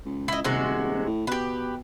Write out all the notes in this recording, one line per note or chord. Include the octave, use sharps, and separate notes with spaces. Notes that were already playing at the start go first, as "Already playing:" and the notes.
C#2
E4 D#5
D#1 C3 G#3 F#4
A2
B2 G4 B4